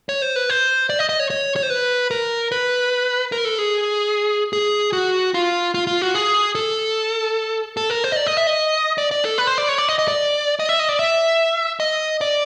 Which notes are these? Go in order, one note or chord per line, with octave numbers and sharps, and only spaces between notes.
C#5
C5
B4
C5
D5
D#5
D#5
C#5
C#5
C#5
C5
B4
A#4
B4
A#4
A4
G#4
G#4
F#4
F4
F4
F4
F#4
G#4
A4
A4
A#4
C5
D#5
D5
D#5
E5
D#5
D5
D5
A4
B4
C5
D5
C#5
D5
D#5
D#5
D5
D#5
E5
D#5
D5
E5
D#5
D5